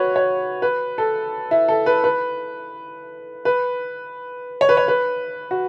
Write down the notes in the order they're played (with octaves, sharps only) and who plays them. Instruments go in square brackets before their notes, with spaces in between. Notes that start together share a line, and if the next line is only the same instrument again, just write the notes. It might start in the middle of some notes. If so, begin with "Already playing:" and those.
Already playing: [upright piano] F#4 B4 C#5
C#5
B4
A4
E4
A4
B4
B4
B4
C#5
B4
C#5
B4
F#4